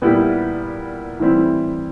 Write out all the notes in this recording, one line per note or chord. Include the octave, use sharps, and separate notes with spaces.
A#2 G3 B3 E4 G4
A2 E3 G3 C4 E4